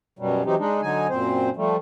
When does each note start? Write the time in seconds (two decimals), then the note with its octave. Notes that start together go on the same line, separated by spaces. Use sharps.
0.19 F#2 B2 F#3 G3
0.45 E3 F#3 C4 D#4 G4
0.59 G#3 D4 D#4
0.82 D3 F#3 D#4 G#5
1.10 F#2 A#2 C4 C5
1.56 F3 G3 A3